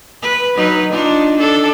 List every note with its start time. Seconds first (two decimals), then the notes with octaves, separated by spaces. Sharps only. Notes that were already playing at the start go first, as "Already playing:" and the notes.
0.22 B4
0.55 F#3 D#4 B4
0.92 D4 D#4 F4
1.39 D4 A4